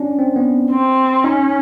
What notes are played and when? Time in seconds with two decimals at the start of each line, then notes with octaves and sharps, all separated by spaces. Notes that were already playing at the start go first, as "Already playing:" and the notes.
Already playing: C#4 D4
0.19 C4
0.36 B3
0.71 C4
1.24 C#4 D#4